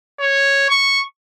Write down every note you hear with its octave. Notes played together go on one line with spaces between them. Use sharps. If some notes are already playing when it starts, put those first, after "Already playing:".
C#5
C#6